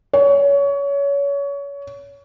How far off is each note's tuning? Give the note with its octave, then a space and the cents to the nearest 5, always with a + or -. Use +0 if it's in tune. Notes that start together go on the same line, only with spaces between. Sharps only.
C#5 +25